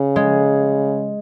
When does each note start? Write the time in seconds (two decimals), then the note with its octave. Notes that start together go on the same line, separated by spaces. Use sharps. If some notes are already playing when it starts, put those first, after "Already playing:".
Already playing: C#3
0.16 G#3